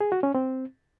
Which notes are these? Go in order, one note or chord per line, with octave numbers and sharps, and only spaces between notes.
G#4
F#4
C#4
C4